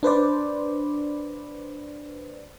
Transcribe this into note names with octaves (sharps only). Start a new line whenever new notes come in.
D4 B4 C5 D5